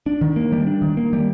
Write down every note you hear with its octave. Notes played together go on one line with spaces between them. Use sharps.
D4
D#3
A#3
G3
D4
D#3
A#3
G3